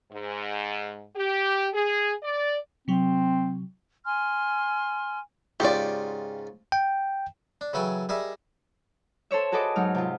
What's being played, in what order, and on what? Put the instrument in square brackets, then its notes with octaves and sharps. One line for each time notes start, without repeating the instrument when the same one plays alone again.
[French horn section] G#2
G4
G#4
D5
[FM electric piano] C3 F#3 [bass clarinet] C4
[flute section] G#5 C6 F6
[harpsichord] G#2 C#3 F4 [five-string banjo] G4 D5
[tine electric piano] G5
[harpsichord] D4
C#3 E3 F#3 A4 G5 G#5
G3 D#4 G#4 A#4 E5
[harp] A4 C5 C#5 E5
F#4 G#4 A4 B4 D#5 D6
G#2 F#3 D#4 F6
C3 F4